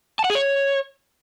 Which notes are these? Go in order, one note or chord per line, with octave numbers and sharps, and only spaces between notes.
A5
F#5
G#4
C#5